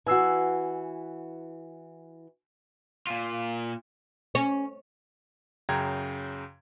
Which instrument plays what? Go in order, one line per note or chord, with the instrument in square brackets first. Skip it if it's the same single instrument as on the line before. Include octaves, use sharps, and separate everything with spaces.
[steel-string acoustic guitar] E3 F#4 [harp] G#5 E6 C7
[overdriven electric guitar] A#2 F4
[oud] C#4
[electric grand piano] F#2 C#3 G5 A#5 G#6